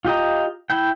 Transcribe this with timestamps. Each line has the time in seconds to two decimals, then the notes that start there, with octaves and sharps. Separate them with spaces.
0.05 F4 G4 D#5 A#5
0.70 E4 G5